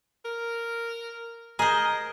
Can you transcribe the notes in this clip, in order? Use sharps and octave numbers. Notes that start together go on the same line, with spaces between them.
A#4
G#4 A#4 C5 D#5